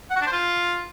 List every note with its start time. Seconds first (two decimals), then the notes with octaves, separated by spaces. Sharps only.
0.10 F#5
0.16 F#4
0.21 D4
0.27 C5
0.32 F4